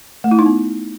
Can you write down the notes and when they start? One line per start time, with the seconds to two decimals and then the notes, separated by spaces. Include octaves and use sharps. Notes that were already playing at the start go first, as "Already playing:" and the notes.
0.24 A3
0.31 E4
0.39 D#4
0.46 B3